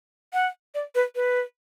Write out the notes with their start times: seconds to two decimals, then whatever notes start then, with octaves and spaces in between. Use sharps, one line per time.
0.33 F#5
0.75 D5
0.95 B4
1.15 B4